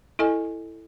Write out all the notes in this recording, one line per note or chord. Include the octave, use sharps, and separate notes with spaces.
E4 A4 D#5 G#5